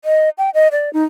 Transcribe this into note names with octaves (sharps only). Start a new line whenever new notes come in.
D#5
G5
D#5
D5
D#4